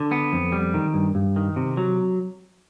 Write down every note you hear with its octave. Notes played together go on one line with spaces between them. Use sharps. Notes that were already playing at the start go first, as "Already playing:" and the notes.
Already playing: D3
B3
F2
G3
D#3
G2
G2
D#3
C3
F#3